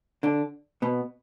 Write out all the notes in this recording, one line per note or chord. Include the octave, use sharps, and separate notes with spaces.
D3 D4
B2 B3